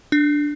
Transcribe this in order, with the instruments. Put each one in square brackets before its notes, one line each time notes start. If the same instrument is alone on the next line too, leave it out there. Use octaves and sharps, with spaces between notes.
[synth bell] D4